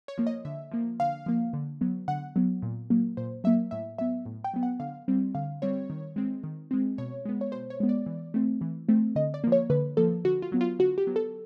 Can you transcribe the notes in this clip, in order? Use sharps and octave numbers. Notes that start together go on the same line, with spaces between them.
C#5
F3 A#3
D#5
D3 E5
F3 A#3
D3 F5
F3 A#3
D3
F#3 B3
D3 F#5
F#3 B3
A#2
F#3 A#3
A#2 C5
F#3 A#3 E5
A2 E5
F#3 B3 E5
A2
G5
F#3 B3
F#5
D3 F5
G3 C4
D3 F5
G3 C4 C#5
D#3
G#3 C4
D#3
G#3 C4
B2 C#5
G#3 B3
C#5
B2 C5
C#5
G#3 B3
D5
E3
A3 C4
E3
A3 C4
D3 D#5
D5
F3 A#3
C#5
D3 B4
F3 A#3 A4
D3 F#4
F4
F#3 B3
F4
D3 F#4
G4
F#3 B3
A4